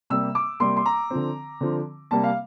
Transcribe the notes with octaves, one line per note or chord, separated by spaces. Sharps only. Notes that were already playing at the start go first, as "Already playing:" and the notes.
C3 G3 A#3 E6
D6
C3 G3 A#3 C6
C6
A#5
D3 F3 C4
D3 F3 C4
C3 G3 A#3 A5
F5